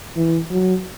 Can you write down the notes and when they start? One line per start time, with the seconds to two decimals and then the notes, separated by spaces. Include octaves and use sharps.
0.17 E3
0.50 F#3